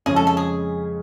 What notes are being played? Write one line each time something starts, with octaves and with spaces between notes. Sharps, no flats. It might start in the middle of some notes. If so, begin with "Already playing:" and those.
F2 C#3 G#3 C#4 G#4
A4
A4
G#4